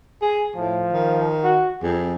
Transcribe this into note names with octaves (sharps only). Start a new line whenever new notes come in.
G#4 G#5
A2 F3
D#3
F#4
F2 G#4